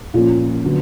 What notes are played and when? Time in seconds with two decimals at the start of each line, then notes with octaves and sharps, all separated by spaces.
0.14 A#2 F3 A#3 C#4 F4
0.64 D3 F#3 B3